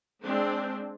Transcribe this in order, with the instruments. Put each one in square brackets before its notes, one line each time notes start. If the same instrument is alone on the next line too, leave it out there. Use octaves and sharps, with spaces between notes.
[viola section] G#3 C4 D4